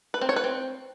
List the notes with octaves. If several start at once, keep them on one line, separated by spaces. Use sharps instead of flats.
B4
C4
C#5
B4
C4